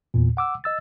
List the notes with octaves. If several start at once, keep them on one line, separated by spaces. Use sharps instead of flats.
E2 A#2
F#5 D6 E6
D#5 E6 A6